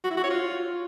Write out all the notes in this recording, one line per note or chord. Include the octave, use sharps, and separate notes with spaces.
F#4
E4
F#4
C#5
F4